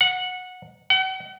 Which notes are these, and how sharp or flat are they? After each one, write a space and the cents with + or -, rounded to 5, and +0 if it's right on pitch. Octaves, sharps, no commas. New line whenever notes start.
F#5 -15
F#5 +40